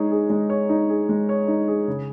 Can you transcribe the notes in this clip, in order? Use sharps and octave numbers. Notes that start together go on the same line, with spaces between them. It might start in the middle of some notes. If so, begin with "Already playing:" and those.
Already playing: G#3 D#4 G#4 C#5
G#4
G#3
C#5
D#4
G#4
G#3
C#5
D#4
G#4
C#3